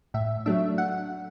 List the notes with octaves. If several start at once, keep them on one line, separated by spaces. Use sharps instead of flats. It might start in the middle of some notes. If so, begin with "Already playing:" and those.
A2 E5
F#3 A3 D4 E5
F#5